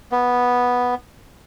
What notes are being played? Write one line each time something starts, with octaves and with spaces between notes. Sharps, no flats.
B3